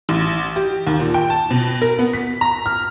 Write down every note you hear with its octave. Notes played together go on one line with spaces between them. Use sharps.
A1
G4
D#2
A#2
G5
A5
B2
A#4
B3
B6
A#5
F6